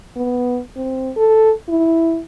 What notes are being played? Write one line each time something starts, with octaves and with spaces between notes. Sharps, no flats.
B3
C4
A4
E4